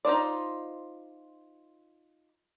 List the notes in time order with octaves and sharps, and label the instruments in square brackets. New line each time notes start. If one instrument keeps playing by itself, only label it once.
[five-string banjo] D#4 F4 C5 D5